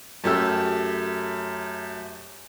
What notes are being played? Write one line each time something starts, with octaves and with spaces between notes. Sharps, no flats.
F#2 A3 G4 E6